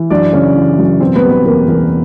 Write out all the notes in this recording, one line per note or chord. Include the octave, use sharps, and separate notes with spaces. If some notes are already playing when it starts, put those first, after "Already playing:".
Already playing: E3
F#2 D4 D5
C#3 C#4 C#5
E3
F#2
B2 C4 C5
B3 B4
G3
B3 B4
E2 A#3 A#4
E2 A#3 A#4